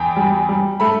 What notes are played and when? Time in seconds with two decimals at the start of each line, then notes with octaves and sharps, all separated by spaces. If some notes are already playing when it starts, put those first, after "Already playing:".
Already playing: E2 G5
0.17 G3
0.49 G3
0.80 A3 B5